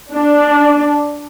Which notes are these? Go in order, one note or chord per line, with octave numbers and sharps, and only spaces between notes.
D4